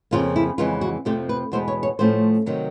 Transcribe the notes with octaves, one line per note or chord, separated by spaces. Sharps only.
F2 C#3 F3 A#3 F4
E4
F2 C#3 E3 G#3 B3 F4
F#4
F2 C3 F3 A3 C4 G4
B4
E2 B2 G#3 B3 C5
C#5
C#5
A2 F3 A3 C#4 C5
C3 D#3 F#3